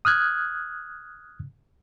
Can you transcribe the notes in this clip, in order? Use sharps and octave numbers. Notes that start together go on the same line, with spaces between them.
D#6 F6 F#6 G#6